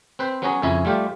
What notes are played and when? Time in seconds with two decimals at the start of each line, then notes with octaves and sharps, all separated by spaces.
0.19 C4 B4 C5
0.42 F#3 B3 C#4 F#4 G#4 A#5
0.62 F2 C#3 C#4 E4 G#5
0.85 G3 A3 F4 G4